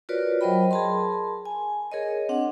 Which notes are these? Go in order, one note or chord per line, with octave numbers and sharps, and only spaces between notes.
F4 F#4 A#4 B4 C#5 D5
F#3 A#4 C5 D#5 G5 B5
G#4 A#4 A5 B5 C6
G#5
G#4 A#4 C#5 D#5
C4 D4 F#5